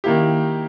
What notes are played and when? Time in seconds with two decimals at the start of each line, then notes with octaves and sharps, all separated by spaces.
0.04 D#3 A#3 E4 G4